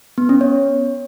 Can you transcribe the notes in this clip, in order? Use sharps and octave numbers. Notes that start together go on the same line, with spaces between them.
B3
C#4
C#5